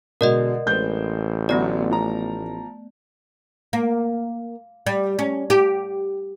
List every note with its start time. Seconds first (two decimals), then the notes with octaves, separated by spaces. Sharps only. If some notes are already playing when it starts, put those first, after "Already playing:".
0.21 B2 D3 G#3 A#4 D5 D#5
0.67 A1 G#3 B3 C4 G6
1.49 D3 F#3 A3 B3 D5
1.91 F3 A#5
3.73 A#3
4.86 G3
5.19 C#4
5.50 G4